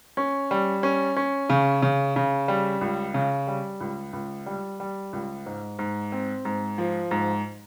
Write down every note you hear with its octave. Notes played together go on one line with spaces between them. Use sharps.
C#4
G3
C#4
C#4
C#3
C#3
C#3
G3
C#2
C#3
G3
C#2
C#2
G3
G3
C#2
G#2
G#2
C4
G#2
F3
G#2